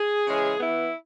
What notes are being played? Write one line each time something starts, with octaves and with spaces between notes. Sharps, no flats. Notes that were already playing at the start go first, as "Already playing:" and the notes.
Already playing: G#4
C#3 E3 G#3 C#4
E3 B3 E4